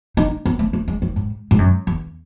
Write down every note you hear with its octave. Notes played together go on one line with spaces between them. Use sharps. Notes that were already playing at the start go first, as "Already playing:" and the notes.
D#4
B3
A3
A3
G#3
E3
G#2
G#2
F#2
E2